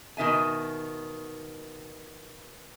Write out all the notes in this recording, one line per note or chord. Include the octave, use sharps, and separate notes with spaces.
B2 D#3 E5 G#5